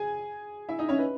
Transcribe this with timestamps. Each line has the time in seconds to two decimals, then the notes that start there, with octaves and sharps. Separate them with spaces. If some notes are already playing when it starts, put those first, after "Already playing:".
Already playing: G#4 G#5
0.69 E4 E5
0.79 D#4 D#5
0.89 C#4 C#5
0.99 B4